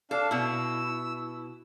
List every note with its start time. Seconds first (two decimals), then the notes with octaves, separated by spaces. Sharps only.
0.11 D4 A4 F5
0.31 B2 E4 E6